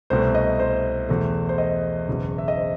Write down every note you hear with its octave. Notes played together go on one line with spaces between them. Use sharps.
C2 B2 A3 C5
D#5
C5
E2 B2 A3
C5
D#5
F#1 E2 B2
E5
D#5
C5